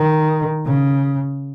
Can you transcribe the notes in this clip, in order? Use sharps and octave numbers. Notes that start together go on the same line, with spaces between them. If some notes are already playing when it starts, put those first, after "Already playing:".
Already playing: D#3
C#3